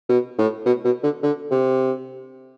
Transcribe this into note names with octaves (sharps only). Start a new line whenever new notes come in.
B2
A2
B2
B2
D3
D3
C3